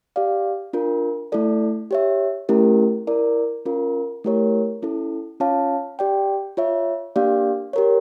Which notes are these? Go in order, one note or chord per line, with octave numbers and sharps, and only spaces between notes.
G4 D5 F5
D4 F4 A#4
A3 E4 A4 D5
G4 C#5 E5
A3 C#4 E4 G4 A#4
E4 A#4 D5
C#4 F4 A#4
A3 E4 G4 A#4 C#5
C#4 E4 A4
C#4 F4 C#5 F5 A5
G4 D5 G5
F4 C#5 E5
A#3 D4 G4 D5 F5
G4 A#4 C#5